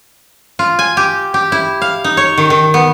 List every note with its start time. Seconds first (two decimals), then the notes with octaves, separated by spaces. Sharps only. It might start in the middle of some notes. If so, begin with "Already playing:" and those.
0.59 F4
0.79 G#5
0.97 G4
1.34 G4
1.52 E4
1.82 F5
2.04 D#4
2.17 C#5
2.38 D#3
2.50 D#3
2.74 B3